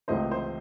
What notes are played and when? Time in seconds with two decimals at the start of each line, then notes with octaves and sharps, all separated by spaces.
0.08 C#2 C3 E3 A3 C5 D#5
0.31 C5